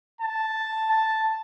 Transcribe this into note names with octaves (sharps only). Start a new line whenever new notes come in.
A5
A5